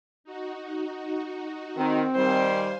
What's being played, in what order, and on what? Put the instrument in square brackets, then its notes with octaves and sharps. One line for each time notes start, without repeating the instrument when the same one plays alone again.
[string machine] D#4 F#4
[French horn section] D#3 [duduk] C4
[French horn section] D#3 G3 [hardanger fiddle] C5 [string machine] F5 G#5 C6